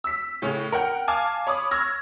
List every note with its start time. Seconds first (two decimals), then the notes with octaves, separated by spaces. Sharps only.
0.04 E6 B6
0.42 A2 C#3 C#4
0.72 A#4 F#5 G5
1.08 F5 G#5 A5 D6 F6
1.47 C#5 B5 D6 D#6
1.71 C#6 E6 F6 G#6 A#6